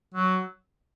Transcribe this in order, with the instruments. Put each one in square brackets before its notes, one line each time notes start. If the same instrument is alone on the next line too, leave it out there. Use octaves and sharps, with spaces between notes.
[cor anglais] F#3